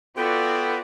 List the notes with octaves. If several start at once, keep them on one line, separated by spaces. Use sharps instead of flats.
B3 F4 F#4 A4 D5 G5